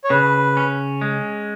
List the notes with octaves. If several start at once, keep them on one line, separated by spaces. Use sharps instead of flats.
C#5
C#3 B4
C#4
G#3